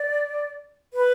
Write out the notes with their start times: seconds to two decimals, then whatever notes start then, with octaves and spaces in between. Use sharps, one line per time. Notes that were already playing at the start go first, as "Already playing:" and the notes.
Already playing: D5
0.94 B4